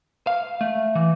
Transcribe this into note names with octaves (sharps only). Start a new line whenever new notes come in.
F5
A3
E3